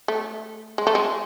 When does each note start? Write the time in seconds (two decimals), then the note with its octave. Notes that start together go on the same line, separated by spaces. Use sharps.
0.08 A3
0.78 G#3
0.87 A3
0.95 G#3